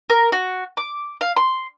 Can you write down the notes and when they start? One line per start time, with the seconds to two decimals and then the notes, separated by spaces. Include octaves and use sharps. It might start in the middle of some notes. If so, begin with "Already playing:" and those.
0.10 A#4
0.32 F#4
0.77 D6
1.21 F5
1.37 C6